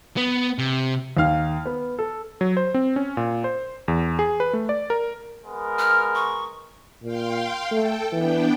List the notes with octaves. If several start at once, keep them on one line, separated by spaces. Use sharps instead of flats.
B3
C3
D#2 D#3 F5 F6
B3
A4
F#3
C5
C4
C#4
A#2
C5
E2
G#4
B4
A3
D5
A#4
G#3 B3 A#4
F6
C#6
A#2 F5 G5 C6
A3 A4 G5
E3 B3 D4 G5